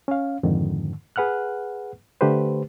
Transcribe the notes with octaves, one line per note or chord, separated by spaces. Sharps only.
C#4 F5
F2 G#2 D3 D#3
G#4 B4 F#5 F6 F#6
D3 A3 G4 B4 C5